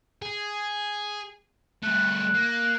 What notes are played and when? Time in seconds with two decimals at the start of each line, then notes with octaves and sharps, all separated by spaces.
0.22 G#4
1.83 G3 A3 F#6
2.34 A#3